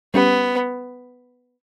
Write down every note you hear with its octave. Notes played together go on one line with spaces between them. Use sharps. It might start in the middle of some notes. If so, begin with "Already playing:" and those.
G3 B3 C#4 G4